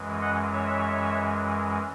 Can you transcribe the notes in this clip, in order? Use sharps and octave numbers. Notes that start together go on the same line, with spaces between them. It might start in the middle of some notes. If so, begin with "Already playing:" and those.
Already playing: F#2 E3 G#3
D#5 F#5
C#5 E5